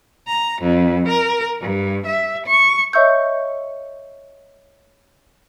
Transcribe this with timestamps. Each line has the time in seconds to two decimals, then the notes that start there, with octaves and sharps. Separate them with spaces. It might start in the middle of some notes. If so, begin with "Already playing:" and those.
0.27 A#5
0.63 F2
1.09 A#4
1.62 G2
2.06 E5
2.47 C#6
2.93 C#5 D#5 E5 C#6 E6 G6